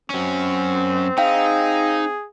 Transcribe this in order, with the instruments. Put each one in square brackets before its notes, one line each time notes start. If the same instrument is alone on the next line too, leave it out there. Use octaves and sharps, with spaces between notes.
[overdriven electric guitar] F#2 C#4 [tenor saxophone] C4
[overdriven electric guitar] D#4 [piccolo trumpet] G#4 [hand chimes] F5 G5